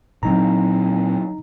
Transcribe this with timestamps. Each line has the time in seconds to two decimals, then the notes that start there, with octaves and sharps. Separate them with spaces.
0.23 A#2 D3 F#3 C4 D#4 A#5